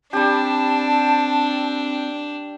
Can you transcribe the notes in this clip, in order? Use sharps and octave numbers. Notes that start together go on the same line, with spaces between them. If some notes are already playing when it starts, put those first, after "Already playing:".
G3 C4 D4 G4 A5